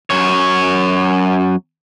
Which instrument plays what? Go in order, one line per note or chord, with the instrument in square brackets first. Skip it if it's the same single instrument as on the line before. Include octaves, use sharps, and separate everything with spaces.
[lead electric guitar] F#2 C#5